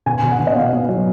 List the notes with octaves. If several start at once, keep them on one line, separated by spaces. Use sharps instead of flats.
B2 G#5
B2
F#5
B2
D#5
B3 F5
B3
F#3